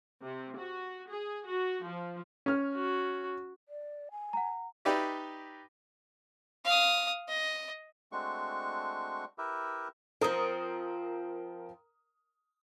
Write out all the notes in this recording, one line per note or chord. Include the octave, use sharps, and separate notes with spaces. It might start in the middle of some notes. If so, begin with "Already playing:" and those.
C3
F#4
G#4
F#4
F3
C#4 F6
F#4
D5
G#5
F#5 A#5
D#4 G4 B4 D5 E5
F5 D#6
D#5
G#3 A3 C4 D4 F#4 C#6
E4 G4 A#4 B4 E5
F3 C4 A#4 A#5 D#6